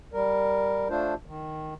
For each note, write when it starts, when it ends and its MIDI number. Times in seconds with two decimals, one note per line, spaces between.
0.13 0.88 55
0.13 0.88 70
0.90 1.14 57
0.90 1.14 62
0.90 1.14 65
0.90 1.14 72
1.26 1.74 51